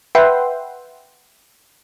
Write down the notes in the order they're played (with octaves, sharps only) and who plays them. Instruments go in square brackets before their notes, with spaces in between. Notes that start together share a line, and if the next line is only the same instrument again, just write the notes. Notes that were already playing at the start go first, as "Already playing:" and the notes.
[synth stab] B4 E5 F#5 G5 C6